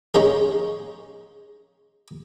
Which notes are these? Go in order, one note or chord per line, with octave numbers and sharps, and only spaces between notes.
G#3 C#4 D#4 G#4